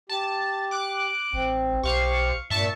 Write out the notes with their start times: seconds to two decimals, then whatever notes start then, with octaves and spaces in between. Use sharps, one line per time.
0.09 G4 A5
0.71 D6 F#6
1.33 A1 C4
1.83 B1 G4 C5 F5 C#6
2.50 G2 A#2 E5 A5 C#6